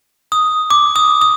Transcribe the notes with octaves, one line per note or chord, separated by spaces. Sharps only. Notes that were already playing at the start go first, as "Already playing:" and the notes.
D#6
D6
D#6
D#6